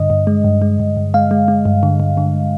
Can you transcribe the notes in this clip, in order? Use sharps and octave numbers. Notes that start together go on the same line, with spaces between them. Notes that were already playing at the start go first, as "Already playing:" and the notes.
Already playing: G2 D3 D#5
G2
G#3
G2
G#3
G2
G2
G#3 F5
G#3
G#3
G2
D3
G2
D3